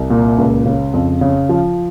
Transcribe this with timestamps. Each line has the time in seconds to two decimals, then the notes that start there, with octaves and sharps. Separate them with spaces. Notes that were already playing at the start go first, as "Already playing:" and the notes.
Already playing: C2
0.10 A#2
0.38 C#2
0.66 C#3
0.94 F2
1.21 C#3
1.49 F3